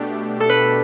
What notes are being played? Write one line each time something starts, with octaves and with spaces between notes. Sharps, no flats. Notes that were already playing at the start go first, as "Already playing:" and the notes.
Already playing: B2 A3 D4 G4
A4
B4